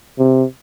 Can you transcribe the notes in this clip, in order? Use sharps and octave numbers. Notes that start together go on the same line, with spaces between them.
C3